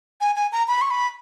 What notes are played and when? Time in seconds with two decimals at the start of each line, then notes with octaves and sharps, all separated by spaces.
0.21 G#5
0.36 G#5
0.52 A#5
0.68 B5
0.82 C#6
0.91 B5